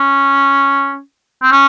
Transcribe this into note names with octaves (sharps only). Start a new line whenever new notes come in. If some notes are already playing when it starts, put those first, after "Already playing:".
Already playing: C#4
C4
C#4